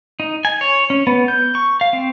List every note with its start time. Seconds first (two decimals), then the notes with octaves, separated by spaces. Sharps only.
0.20 D#4
0.45 G#5
0.61 C#5
0.90 C#4
1.07 B3
1.28 G6
1.55 C#6
1.81 F5
1.93 C4